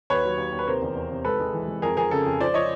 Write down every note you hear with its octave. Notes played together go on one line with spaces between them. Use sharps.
D#2 B4 C#5
F#3
D#2
D#2
B4
C3 A#4 C5
E2
E2
C3
G#1 A4 B4
G#3
E3
G#3
F2 G#4 A#4
F2 G#4 A#4
C#3 A4
F2
F3 C5 D5
F3 C#5 D#5